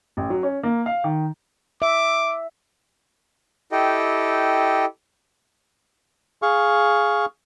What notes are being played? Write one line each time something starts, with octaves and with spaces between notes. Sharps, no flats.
A1
F#3
C#4
A#3
F5
D#3
E5 D6
E4 G4 A4 D#5 G5
G#4 F5 C#6